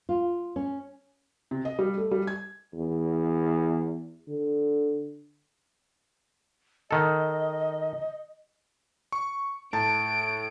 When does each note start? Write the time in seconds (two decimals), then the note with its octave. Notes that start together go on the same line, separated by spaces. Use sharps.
0.09 F4
0.56 C#4
1.51 C3
1.65 D#5
1.79 G3
1.97 A3
2.11 G3
2.27 G#6
2.74 E2
4.28 D3
6.91 D#3 A4 D#5
9.12 C#6
9.73 A2 A5 D7